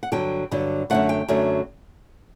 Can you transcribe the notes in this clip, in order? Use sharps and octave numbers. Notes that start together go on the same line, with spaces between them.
F#5
G2 D3 F#3 G5
G2 D3 F#3
F#2 D3 F#3 A3 F#5
G5
F#2 D3 F#3 A3